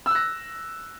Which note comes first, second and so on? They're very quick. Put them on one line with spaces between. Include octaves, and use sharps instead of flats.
E6 F#6 A#6